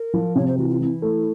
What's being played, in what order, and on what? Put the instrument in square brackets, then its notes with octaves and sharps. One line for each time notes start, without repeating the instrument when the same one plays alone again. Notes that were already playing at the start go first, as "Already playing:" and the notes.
Already playing: [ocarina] A#4
[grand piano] F3
[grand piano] C3 [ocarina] C#5
[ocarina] C5
[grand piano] E3 [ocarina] F#4
[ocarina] F4
[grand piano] E3 [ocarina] E4
[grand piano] A3